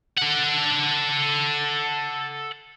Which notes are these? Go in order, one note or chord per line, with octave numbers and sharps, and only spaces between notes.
A4 F#5